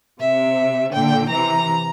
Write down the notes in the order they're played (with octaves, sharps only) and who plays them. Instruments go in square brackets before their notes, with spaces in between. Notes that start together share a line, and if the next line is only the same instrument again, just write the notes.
[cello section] C3 [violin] E5
[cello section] A#2 D3 [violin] G5
[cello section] C3 E3 [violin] A#5